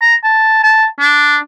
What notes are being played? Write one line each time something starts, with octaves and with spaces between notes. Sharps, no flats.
A#5
A5
A5
D4